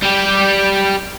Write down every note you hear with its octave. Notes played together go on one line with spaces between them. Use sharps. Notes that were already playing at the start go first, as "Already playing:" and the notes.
G3 G4